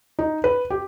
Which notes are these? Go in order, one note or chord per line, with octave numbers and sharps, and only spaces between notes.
D#4
B4
G4